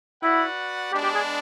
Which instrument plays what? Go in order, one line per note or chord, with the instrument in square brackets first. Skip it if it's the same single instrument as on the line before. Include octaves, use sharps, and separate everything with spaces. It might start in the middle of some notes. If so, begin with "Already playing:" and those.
[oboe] E4 [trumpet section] F#4 B4 D5 F#5
[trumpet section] G#3 B3 D4 [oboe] G4
[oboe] G4
G#4